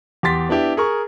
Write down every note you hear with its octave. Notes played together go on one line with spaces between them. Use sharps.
E2 G4 C6 A6 B6
B3 D4 E4 G4
G#4 A#4 C#6